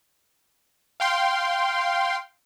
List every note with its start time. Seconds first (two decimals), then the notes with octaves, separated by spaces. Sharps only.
1.00 F5 G5 C6